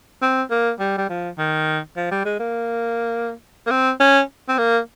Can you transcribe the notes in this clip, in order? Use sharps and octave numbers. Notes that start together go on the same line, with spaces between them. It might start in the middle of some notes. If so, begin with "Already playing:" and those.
C4
A#3
G3
G3
F3
D#3
F3
G3
G#3
A#3
A#3
C4
C#4
C4
A#3